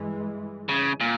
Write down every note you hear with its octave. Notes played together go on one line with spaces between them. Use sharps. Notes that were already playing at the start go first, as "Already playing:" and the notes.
Already playing: G2 E3 G#3
C#3
A#2